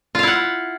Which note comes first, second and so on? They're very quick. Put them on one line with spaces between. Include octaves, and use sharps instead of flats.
F4 F5 E4 F#5